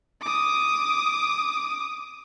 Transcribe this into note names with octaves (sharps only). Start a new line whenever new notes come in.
D6 D#6